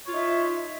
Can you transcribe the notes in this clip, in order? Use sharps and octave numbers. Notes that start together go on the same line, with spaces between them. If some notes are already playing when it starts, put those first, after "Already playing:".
D#4 F4 C#5 E5